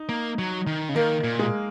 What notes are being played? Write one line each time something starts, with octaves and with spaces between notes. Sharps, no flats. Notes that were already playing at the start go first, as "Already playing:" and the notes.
Already playing: D#4
A#3
F#3
D#3
C#3
D#3 A#3
A#2
G#3